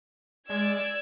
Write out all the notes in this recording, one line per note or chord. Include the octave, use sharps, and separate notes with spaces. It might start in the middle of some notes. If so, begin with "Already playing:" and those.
G#3 D5 E6 G#6